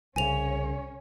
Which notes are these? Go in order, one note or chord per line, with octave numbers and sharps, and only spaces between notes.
C2 C#3 C#4 C#5 G#5 F7